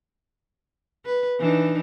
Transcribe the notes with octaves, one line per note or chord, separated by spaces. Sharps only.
B4
E3 D4 D#4